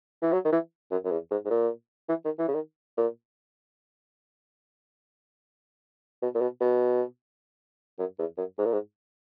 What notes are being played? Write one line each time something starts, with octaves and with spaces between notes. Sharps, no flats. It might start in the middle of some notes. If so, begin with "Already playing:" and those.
E3
F#3
D#3
E3
F#2
F#2
E2
G#2
G#2
A#2
E3
D#3
E3
C#3
D#3
A#2
B2
A#2
B2
B2
F#2
E2
F#2
G#2
A#2
G#2